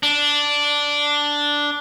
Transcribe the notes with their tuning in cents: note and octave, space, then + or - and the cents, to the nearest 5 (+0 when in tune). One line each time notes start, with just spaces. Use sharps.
D4 -5